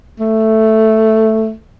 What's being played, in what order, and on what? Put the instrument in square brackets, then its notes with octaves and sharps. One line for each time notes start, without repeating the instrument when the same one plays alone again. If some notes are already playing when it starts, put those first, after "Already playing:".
[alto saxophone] A3